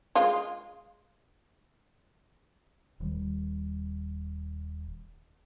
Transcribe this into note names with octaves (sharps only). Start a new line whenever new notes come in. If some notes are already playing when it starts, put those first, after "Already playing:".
G#3 F4
D#1 D#3 G3